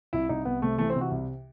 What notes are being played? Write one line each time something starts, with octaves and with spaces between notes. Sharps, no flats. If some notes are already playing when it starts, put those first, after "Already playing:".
C2 E4
C2 D#4
C2 B3
C3 A3
E3 A3
C4
C3
F#4
C2